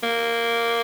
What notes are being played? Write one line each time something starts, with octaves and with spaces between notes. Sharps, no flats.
A#3